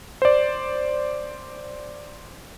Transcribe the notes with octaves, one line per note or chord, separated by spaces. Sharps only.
C5 D5